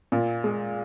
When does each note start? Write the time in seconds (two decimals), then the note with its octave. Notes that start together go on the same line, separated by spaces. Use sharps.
0.12 A#2
0.44 G#3